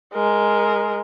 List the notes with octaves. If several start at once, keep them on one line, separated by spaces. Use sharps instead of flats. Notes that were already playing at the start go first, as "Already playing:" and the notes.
G#3 A#4